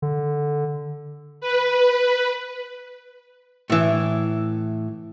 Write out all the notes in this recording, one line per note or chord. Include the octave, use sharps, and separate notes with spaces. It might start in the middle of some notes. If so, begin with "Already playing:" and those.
D3
B4
A2 E3